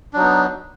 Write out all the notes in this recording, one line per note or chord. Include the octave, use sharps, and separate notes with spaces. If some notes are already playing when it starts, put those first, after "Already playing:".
F#3 B3 D4 D#4